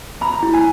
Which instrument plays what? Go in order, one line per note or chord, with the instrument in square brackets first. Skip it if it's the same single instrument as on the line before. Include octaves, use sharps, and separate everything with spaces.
[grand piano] A#5 [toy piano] B5
[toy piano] E4
[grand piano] G#5